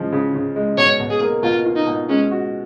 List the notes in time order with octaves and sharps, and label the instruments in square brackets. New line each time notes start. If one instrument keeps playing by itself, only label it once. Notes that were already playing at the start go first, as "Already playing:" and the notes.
Already playing: [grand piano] C#3 F3 G#3
C#3
C#3
G#3
[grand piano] B2 [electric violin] C#5
[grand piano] B2
[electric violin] G#4
[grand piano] A#3
[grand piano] B2 [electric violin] F4
[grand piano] F4
[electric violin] D#4
[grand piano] B2
[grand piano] G#3 [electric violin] C#4
[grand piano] F#4